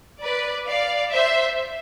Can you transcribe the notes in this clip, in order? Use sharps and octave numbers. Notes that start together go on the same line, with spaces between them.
B4 D5
D5 F5
C5 E5